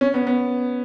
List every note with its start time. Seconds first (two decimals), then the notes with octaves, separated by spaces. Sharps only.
0.01 C#4
0.14 B3
0.27 B3